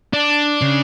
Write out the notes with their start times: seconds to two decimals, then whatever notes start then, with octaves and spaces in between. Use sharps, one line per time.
0.13 D4
0.61 C#3